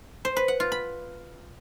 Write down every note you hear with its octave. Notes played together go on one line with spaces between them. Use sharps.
C5
B4
F#5
F4
B5